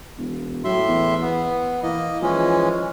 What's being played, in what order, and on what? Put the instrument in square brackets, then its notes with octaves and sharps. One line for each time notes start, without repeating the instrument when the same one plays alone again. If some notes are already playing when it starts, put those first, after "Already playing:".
[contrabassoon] E1
[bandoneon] A2 E5 C6 [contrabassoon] F#3
[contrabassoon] E2
[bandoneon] B3
[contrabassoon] E3 [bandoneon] A#3 D#5
[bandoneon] E3 G#3 C#4 [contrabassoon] F3